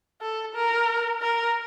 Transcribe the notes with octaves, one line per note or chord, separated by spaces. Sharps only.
A4
A#4
A#4